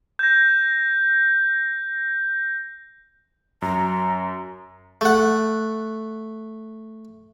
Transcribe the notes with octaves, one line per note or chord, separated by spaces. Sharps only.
G6 A#6
F#2 A#5
A3 F#5